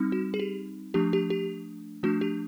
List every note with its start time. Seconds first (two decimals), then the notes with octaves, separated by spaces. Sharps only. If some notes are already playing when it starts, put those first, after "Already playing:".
Already playing: G3 C4 D#4
0.12 F#4
0.34 G#4
0.40 G4
0.94 F3 A3 D4 G4
1.13 G4
1.30 G4
2.03 F3 A3 D4 F#4
2.21 G4